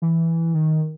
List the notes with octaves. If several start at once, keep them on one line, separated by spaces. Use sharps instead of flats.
E3
D#3